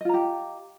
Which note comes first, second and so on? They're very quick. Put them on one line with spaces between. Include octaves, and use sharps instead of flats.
D#5 F4 A#5 G4